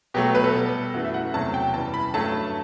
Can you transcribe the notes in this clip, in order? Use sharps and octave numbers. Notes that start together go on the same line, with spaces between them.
B2 F#3 A3 G4
B4
A4
B2 G3
F#2 E3 A3 F#4
E5
F#5
E2 C3 F#3 A3 A5
G5
F#2 E3 G3 A5
B5
G2 F#3 A3 A5